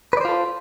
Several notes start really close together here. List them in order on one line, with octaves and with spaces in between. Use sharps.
B4 D5 C5 F4 A4